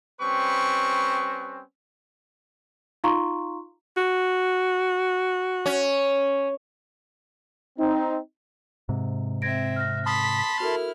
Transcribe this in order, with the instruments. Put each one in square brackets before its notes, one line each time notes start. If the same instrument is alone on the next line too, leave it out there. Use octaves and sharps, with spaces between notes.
[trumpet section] G3 C4 C#4 B4 C#6
[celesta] D#4 F4 F5 A#5 C6 C#6
[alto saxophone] F#4
[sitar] C#4
[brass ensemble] C4 D#4
[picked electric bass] G#2 C3
[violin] C4 E5 [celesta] G#6 A#6 D7
[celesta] F6 F#6 A#6
[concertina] A5 B5 C6 [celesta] D#6 [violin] B6
[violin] E4 F6 [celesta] F#4 A4 A#4